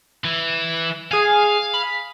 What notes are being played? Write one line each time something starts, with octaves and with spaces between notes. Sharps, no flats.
E3
G#4 F5 G#5
B5